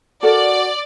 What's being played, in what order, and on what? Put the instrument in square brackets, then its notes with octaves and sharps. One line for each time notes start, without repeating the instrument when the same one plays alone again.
[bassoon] F#4 [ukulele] A4 A#4 [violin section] D5